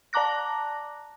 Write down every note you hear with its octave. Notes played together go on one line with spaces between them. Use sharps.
D5 A5 A#5 D6 F#6 A#6